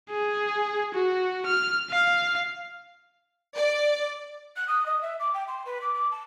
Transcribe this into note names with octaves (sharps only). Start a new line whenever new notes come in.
G#4
F#4
F6
F5
D5
F#6
D#6
D#5
E5
D6
G5
C6
B4
D6
D6
A5